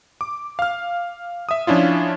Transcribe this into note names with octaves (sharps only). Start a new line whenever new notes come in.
D6
F5 F6
E5 D#6
F3 C#4 D4 E4 F4